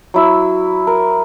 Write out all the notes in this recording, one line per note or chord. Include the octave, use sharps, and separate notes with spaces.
F#3 E4 E6
A#4